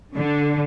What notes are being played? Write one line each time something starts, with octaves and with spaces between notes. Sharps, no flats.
D3